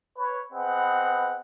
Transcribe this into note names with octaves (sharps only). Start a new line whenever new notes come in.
B4 C#5
B3 C4 G#4 B4 D#5 F#5